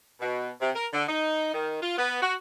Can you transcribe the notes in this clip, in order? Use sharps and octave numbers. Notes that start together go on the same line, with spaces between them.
B2
C3
A#4
D3
D#4
D#3
F4
B3
F#4